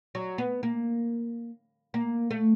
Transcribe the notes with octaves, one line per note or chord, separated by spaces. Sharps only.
F#3
B3
A#3
A#3
A3